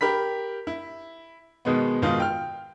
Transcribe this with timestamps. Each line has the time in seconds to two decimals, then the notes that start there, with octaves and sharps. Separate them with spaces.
0.01 G4 A#4 B5 B6
0.67 E4
1.65 B2 D#3 G#3 B3
2.02 G#2 B2 D#3 D#4 F4
2.20 G5 F6